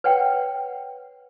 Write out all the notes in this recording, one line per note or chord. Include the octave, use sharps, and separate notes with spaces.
B4 C#5 F#5 G5